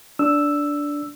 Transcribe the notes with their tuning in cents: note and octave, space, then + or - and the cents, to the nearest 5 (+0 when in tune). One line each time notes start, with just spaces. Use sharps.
D4 -10 E6 +0